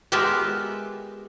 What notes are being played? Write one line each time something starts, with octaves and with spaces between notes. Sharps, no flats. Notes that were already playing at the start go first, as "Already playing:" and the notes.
G#3 B3 F4 G4 A#4 E5